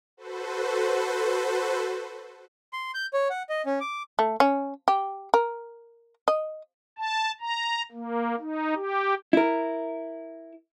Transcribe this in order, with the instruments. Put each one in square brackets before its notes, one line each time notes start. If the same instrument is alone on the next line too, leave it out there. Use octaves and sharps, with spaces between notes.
[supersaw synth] F#4 A4 B4 C5
[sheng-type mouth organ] C6
G6
C#5
F#5
D#5
C#4
D6
[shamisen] A3
C#4
G4
A#4
D#5
[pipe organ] A5
A#5
A#3
D#4
G4
[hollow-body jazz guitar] E4 A#4